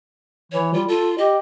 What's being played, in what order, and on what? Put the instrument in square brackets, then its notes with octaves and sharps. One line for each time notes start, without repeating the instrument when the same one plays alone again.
[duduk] E3 [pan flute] C#5
[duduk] G3 [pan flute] F4
[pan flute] F4 [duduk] A4
[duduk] G4 [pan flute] D#5